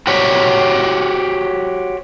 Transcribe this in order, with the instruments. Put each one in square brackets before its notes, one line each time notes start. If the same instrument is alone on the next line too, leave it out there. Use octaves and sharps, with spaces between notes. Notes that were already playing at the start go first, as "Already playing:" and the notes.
[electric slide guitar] F#4 G4 C5 C#5